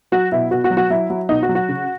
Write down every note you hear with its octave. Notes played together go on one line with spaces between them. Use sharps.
F#3 F#4
B2 E4
B2 F#4
F#4
F#3
F#4
F#3 E4
F#3
B2 D#4
F#4
F#3
F#4
C#3